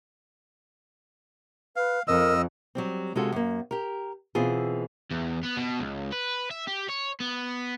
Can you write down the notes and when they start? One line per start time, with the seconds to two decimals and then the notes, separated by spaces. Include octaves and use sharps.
1.76 B4 F5
2.08 F2 A#4 D#5 E6
2.75 F#3 G3 C4
3.15 C3 G#3 C#4 F4 F#4 A4
3.32 F#2 A#3
3.71 G4 A#4
4.35 B2 E3 C4 F4 G#4
5.11 E2
5.43 B3
5.57 B2
5.79 C#2
6.12 B4
6.51 E5
6.67 G4
6.89 C#5
7.20 B3